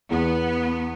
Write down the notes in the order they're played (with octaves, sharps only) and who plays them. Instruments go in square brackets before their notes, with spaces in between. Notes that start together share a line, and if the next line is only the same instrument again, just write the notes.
[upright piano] E2 [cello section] B3